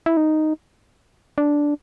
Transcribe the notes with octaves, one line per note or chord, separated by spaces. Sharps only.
E4
D#4
D4